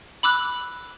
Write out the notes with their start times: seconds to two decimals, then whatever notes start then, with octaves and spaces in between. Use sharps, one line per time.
0.23 B5 D6 E6 F#6